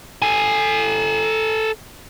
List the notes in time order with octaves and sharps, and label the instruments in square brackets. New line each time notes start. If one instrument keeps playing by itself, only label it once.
[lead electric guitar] A4 G#5